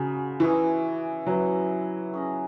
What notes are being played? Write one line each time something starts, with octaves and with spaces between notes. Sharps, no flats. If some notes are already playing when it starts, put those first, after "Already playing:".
Already playing: C#3 G#3 D#4 F#4 A#4
E3 C#4 E4 B4 D#5
F#3 C#4 E4 B4 D#5
C#4 G#4 D#5